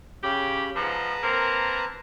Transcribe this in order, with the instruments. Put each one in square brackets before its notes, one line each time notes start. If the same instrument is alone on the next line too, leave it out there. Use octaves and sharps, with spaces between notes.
[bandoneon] C#3 C#4 B5 [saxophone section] G4
[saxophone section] G#2 F3 [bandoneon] B4 A5 A#5
[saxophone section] A#3 C4 A#4